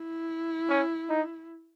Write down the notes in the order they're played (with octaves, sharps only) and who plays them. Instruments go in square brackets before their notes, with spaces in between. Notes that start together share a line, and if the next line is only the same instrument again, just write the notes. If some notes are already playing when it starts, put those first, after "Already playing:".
Already playing: [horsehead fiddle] E4
[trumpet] C#4
D#4